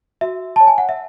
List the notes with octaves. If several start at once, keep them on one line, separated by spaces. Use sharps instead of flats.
F#4 E5
C#5 A5
G#5
F#5
E5